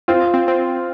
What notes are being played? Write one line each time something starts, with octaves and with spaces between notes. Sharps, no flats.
C4 F4
C4
C4